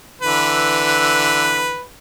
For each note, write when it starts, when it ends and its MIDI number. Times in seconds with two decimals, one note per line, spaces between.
0.22 1.84 50
0.22 1.84 52
0.22 1.84 71